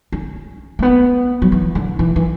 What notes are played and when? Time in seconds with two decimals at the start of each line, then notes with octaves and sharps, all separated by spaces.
0.12 C#4
0.79 A3
0.82 B3
1.42 F#3
1.52 E3
1.75 D3
1.99 E3
2.16 E3